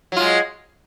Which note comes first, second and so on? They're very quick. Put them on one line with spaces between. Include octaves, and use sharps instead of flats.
F#3 F4 G#3